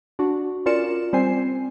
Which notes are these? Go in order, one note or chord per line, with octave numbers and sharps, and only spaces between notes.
D4 F#4
C#4 F4 A#4 D5 C#7 E7
G3 C4 C5 G#5 C7